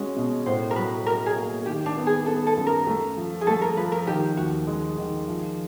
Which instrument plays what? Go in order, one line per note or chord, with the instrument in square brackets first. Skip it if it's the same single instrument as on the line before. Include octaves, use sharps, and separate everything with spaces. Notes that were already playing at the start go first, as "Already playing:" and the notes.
Already playing: [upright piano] G#3 C#4 F#4
B2
[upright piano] A2 [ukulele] C5
[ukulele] A#4
[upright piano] F#3 [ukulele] B4
[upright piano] F#3 [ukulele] A#4
[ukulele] G#4
[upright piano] A#3
[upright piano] D#3 [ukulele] G4
[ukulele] D4
[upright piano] B3
[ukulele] G#4
[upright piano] B3 [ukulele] A4
[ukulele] A4
[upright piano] F#2
[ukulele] A#4
[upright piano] A3
F3
[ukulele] G#4
[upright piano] A3 [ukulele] A4
[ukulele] A#4
[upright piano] F3 [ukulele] B4
[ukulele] A#4
[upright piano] D#3 [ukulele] G4
[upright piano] D#2 [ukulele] F#4
[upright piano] G#3
D#3
F3